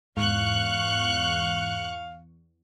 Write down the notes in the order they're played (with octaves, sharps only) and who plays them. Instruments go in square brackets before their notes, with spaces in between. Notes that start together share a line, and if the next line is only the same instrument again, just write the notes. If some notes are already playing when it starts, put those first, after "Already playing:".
[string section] E2 C#6 F#6 [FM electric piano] G#2 [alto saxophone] F5